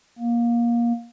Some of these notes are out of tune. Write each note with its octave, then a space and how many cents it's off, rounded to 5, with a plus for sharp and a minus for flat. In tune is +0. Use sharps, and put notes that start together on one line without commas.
A#3 +20